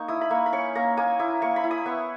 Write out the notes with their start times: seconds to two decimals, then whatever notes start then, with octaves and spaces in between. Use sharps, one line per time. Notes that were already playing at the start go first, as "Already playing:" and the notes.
Already playing: A#3 D#4 C#6
0.08 E4 D#6
0.21 B5
0.30 A#3 C#6
0.46 B5
0.52 C#4 C#6
0.75 A#3 A#5
0.97 A#3 G#5
1.19 E4 D#6
1.42 A#3 C#6
1.56 B5
1.64 E4
1.71 D#6
1.86 B3 C#6